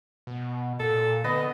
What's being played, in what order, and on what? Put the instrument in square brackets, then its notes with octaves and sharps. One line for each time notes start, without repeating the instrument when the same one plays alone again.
[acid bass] B2
[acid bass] A#2 [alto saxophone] A4
[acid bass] D3 [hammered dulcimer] B3 [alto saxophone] D#5